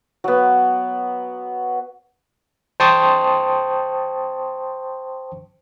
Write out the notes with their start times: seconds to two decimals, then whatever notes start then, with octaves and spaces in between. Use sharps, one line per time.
0.24 F#3 B3
2.80 C5 G5 A5 C6 C#6 D#6